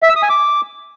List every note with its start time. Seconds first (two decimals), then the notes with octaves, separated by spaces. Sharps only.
0.02 E5
0.09 E6
0.16 D#6
0.23 G#5
0.29 D6